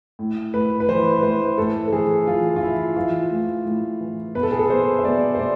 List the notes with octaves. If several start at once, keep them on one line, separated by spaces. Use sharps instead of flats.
A2
A2 B4
B4
E3 C5
A2 C5
A2 A4
A4
E3 G#4
E3 F4
F4
E3 E4
E3 F4
A2
A2
E3
B2 B4
A4
G#4
A4
B2 C5
E5
B2 D5
C5
B2 D5